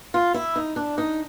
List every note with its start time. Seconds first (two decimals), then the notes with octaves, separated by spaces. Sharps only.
0.14 F4
0.34 E4
0.56 D#4
0.76 D4
0.98 D#4